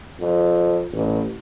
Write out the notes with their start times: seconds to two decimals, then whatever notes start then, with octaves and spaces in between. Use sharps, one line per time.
0.20 F2
0.92 A1